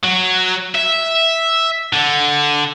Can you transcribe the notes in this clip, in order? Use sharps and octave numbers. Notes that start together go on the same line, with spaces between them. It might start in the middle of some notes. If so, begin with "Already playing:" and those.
F#3
E5
D3